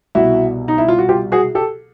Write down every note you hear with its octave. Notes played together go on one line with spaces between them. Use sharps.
C2 B2 E4 F#4
D#4
E4
F4
F#4
F4 G4
F#4 G#4
G4 A4